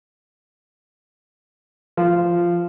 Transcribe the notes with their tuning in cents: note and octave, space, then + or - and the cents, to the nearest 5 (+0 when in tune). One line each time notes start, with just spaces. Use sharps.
F3 -10